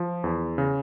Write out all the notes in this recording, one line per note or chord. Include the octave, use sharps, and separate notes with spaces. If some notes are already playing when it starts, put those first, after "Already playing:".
Already playing: F3
E2
C#3